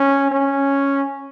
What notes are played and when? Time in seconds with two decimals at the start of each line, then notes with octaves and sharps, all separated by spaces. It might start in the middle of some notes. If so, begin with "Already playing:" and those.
Already playing: C#4
0.31 C#4